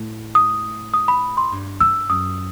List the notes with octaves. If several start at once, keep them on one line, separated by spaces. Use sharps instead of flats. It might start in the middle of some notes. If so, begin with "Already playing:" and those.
Already playing: A2
D#6
D#6
B5
C6
G2
G2 E6
F#2 D#6